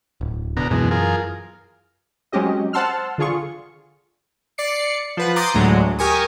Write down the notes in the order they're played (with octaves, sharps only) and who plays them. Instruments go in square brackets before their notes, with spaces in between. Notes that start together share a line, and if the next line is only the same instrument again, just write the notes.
[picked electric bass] D1
[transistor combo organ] B2 D3 A#5
[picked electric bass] F#2 E3 [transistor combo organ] B2 G#3
[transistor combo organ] F4 G#4 A#4
[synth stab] F#3 G#3 C4 C#4 G4 D#5
C5 F#5 A5 C6 E6 F6
D3 F4 G#4 C#6
[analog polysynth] D5 C7 C#7
F3 B4 F#5
A#5 C6 D6 D#6 G6 A6
D2 A2 D3 F#3 G#3
G4 A#4 G#5 C#6 D#6